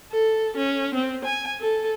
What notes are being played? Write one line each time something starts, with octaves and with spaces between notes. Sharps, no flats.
A4
C#4
C4
G#5
A4